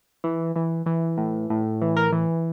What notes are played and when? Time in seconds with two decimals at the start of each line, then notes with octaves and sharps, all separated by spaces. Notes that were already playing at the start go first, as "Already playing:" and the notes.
0.24 E3
0.56 E3
0.86 E3
1.18 A2
1.50 A2
1.82 E3
1.97 A#4
2.12 E3